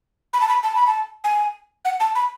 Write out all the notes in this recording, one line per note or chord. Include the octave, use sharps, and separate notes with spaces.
B5
A5
B5
A5
B5
A5
G#5
F#5
A5
B5